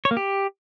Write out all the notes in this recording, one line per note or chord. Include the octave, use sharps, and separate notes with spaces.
C#5
A#3
G4